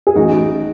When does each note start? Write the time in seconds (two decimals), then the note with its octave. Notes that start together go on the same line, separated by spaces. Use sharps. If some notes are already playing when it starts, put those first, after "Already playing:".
0.07 G#4
0.16 A1 D#4 F#4